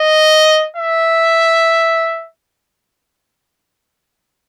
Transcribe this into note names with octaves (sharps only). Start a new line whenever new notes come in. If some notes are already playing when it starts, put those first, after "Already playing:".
Already playing: D#5
E5